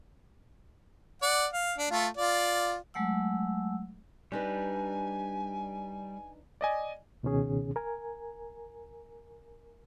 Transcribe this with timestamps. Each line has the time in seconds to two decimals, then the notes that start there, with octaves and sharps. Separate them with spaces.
1.22 D5 F#5
1.53 F5
1.78 D4
1.91 A3 F4 A4
2.17 F4 D5
2.94 F#3 G#3 A3 F#5 E6
4.32 G3 D4 D#4 B4 G#5
6.61 D5 D#5 G#5
7.23 C#2 B2 D#3 C#4 G#4
7.76 A#4 G#5